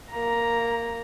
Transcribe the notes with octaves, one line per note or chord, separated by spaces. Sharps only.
A#3 A#5